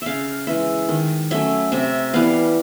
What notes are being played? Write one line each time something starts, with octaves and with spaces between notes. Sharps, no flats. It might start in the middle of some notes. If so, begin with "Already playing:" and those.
C#3 E5 F5
E3 G#3 E5
D#3
F#3 A3 C#4 E5
C3 E5
E3 G3 B3 F5